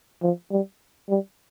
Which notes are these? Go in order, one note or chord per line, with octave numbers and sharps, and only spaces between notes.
F3
G3
G3